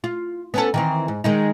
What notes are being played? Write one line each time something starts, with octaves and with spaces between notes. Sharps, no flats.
F4
B3 C#4 A4
D#3 E3 C4
G#2
D#3 G#3 D#4